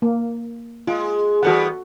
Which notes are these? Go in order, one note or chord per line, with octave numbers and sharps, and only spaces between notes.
A#3
G#3 F4
E3 G3 B3 F#4 A4 F#5